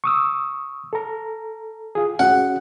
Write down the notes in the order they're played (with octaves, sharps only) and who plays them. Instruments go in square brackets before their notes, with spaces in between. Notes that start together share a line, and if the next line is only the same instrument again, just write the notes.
[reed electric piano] C#6 D#6 E6
A4 A#5
F4 G#4
[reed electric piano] C#4 F#4 G#4 [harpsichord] F#5